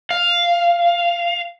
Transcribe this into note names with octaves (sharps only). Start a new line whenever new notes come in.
F5